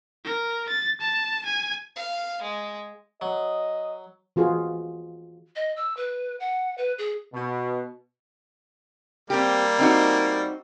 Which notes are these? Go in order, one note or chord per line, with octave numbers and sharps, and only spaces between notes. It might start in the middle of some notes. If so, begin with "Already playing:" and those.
A#4
A6
A5
G#5
F5
G#3
F#3 D#5
E3 F4 F#4 G#4
D#5
E6
B4
F#5
B4
G#4
B2
G3 A#3 C4 G4
C4 D#4 F#4